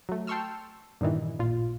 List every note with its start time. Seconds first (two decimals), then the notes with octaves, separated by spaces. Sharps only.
0.09 F#3 A3
0.27 G5 A5 C6 C#6 E6 F6
1.01 G2 A#2 D#3 E3
1.39 A1 A#2 F4